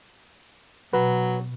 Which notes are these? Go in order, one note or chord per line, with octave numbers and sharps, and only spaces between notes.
B2 F#3 B4